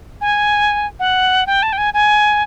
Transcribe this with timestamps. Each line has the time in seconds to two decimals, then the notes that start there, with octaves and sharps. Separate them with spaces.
0.21 G#5
1.00 F#5
1.47 G5
1.63 A5
1.73 G5
1.78 G#5
1.94 G#5